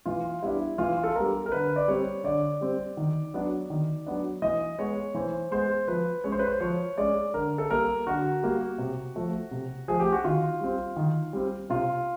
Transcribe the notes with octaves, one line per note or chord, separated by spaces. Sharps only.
E3 F4
G3 B3 D4 E4
E3 F4
A4
G3 B3 D4 A#4
A#4
D3 B4
D5
G3 C4 C#5
D3 D5
G3 C4
D#3
F#3 B3 D4
D#3
F#3 B3 D4
E3 D#5
G#3 B3 C#5
E3 C5
G#3 B3 C5
F3 B4
G#3 C#4 C#5
C5
B4
C5
F3 C#5
G#3 C#4 D5
D3 A#4
A4
G3 A#3 A#4
D3 F#4
G3 A#3
C3
F3 A3
C3
F3 A3 G#4
G4
F#4
D#3 F4
G3 C4
D#3
G3 C4
C3 F4